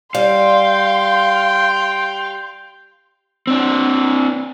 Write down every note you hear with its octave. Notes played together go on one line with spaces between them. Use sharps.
G3 F5 G5 C6
C4 D4